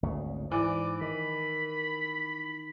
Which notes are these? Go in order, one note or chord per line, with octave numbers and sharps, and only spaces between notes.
G#1 D2 C#3
G#2 E3 D5
D#3 B5